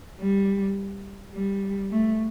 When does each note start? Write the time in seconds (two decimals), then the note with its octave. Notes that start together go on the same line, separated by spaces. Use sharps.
0.21 G3
1.35 G3
1.91 A3